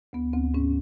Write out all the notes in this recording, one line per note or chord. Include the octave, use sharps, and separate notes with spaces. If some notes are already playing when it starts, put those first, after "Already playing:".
D2 B3
D2 C4
G#2 C#4